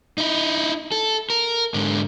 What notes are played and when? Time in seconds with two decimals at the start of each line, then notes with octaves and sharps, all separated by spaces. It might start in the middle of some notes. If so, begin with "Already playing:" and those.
0.18 D#4 E4
0.92 A4
1.30 A#4
1.74 G#2 D3